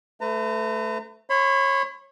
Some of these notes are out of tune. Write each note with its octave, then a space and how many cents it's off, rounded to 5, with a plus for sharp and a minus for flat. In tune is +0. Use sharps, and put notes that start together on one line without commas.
A3 +0 B4 +35 A#5 -35
C#5 -25 B5 +35